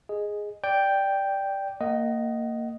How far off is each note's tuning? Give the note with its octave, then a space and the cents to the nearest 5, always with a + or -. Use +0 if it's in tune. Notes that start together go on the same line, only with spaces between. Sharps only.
G#4 +0 D#5 +0
D5 +0 G5 +0
A#3 -20 D#5 +0 F#5 +30